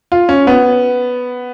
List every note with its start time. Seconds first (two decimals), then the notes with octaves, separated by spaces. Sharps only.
0.12 F4
0.29 C#4
0.47 B3